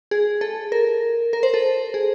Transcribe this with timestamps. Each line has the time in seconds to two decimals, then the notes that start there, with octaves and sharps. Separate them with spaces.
0.11 G#4
0.41 A4
0.72 A#4
1.33 A#4
1.43 C5
1.54 A4
1.94 G#4